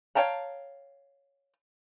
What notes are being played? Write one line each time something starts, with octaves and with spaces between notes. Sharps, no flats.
C#5 F5 G5 A5 A#5